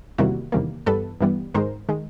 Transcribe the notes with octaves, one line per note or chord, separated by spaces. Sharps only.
E2 C3 D#3 G3 A#3 E4 F#4
E2 C3 D#3 G3 A#3
G2 E3 G3 B3 A4 B4
G2 E3 G3 B3
G#2 D#3 G#3 A#4 C5
D#3 G#3